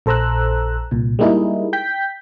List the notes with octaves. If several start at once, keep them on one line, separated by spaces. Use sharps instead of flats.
A#1 A4 C5 A#5 E6 F#6
C2 A#2
G3 G#3 A#3 D#4 E4 G#4
G5 G6 B6